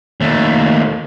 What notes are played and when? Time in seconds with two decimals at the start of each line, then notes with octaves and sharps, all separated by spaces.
0.21 D#2 A3